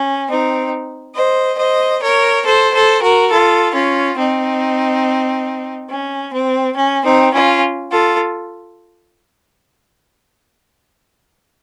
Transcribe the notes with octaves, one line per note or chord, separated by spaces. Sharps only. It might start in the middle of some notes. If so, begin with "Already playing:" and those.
Already playing: C#4
C4 D#4
C5 D#5
C5 D#5
A#4 C#5
A4 C5
A4 C5
F#4 A#4
F4 A4
C#4 F4
C4 D#4
C#4
C4
C#4
C4 D#4
C#4 F4
F4 A4